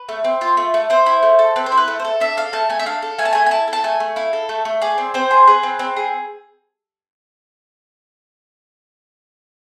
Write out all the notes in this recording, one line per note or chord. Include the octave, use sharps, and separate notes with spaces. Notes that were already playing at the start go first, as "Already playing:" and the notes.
Already playing: B4
A3
C4
F4
A3
A3
C4 C5
E4
A3
A4
C4 B4
C5
E4
B4
A3
C5
A4
D4 E5
A4 F5
A3 A5
A3 G#5
E5
D4 F5
A4
A3 G#5
A5
A3 G#5
G#5
E4 A5
A4
A5
A3 G#5
A3
E4 F5
A4
A3
A3
G#4 D5
C4
C4 C5
G#4
G#4 B4
C4
C4
G#4